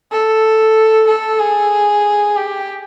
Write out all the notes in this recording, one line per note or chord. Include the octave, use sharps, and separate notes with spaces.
A4
A4
G#4
G4